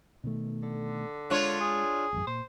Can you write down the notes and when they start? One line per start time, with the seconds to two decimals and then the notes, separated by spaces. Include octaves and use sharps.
0.24 B2 D#3 A3
0.63 D3
1.30 G#3 D4 F4 C#5
1.61 G#4
2.13 A1 F#2
2.27 A#2 C5